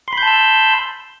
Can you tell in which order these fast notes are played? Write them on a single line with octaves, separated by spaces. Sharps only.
C6 B5 G6 A5 E6